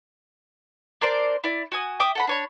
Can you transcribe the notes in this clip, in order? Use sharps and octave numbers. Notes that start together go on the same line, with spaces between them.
D4 A#4 C5 D5
E4 D5
F#4 G#5 D#6
E5 G5 D6 D#6
A4 F#5 B5
D4 C#5 B5